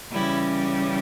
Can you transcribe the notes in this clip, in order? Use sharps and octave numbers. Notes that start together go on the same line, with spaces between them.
C#3 E3 G3 C#4 E4